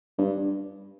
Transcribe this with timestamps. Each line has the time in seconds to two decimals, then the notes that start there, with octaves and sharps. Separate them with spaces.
0.18 G2